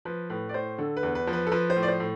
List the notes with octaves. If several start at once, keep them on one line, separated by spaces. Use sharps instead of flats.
F3 B4
A2 B4
D5
A2 C5
D3 A4
B4
E2
B4
F3
B4
A4
F3 B4
C5
A2
D5
C5
A2